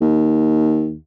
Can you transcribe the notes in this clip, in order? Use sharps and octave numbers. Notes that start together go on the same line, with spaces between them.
D#2